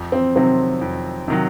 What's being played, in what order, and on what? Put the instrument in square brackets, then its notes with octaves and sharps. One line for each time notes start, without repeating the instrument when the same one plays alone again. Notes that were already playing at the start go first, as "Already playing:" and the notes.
Already playing: [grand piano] F2
[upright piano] C4
[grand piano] C3 D#3 F#3 [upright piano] C4
[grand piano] F2
C3 D#3 F#3